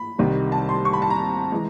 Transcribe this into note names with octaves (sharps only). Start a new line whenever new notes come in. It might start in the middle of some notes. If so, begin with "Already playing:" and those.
Already playing: B5
C2 C3 D#3 G3
A5
C6
C#6
B5
A5
A#5
E3 G#3